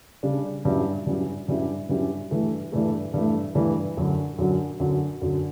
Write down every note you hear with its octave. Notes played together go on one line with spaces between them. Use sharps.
C#3 G3 D4
G2 F#3 C#4 E4 G4
G2 F#3 C#4 E4 G4
G2 F#3 C#4 E4 G4
G2 F#3 C#4 E4 G4
G2 E3 A3
G2 E3 A3
G2 E3 A3
G2 E3 A3
F#2 D3 F#3
F#2 D3 F#3
F#2 D3 F#3
F#2 D3 F#3